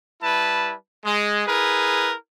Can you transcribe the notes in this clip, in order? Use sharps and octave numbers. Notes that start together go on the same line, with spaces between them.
G3 E4 B4 A5
G#3
E4 G#4 A#4 B4